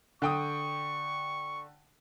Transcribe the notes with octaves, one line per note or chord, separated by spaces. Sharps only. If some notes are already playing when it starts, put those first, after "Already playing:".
D3 G5 C#6 D#6